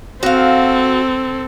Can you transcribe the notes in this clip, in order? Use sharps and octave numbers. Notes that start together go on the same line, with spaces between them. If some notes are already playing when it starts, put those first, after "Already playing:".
C4 F#4 A4 F5